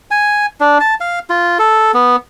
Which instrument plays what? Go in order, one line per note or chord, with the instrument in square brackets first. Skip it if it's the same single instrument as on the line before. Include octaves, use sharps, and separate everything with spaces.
[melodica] G#5
D4
A5
F5
F4
A4
B3